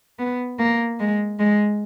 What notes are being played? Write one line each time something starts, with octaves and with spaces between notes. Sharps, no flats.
B3
A#3
G#3
G#3